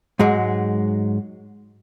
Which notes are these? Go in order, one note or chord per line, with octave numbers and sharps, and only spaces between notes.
G#2 F#3 G#3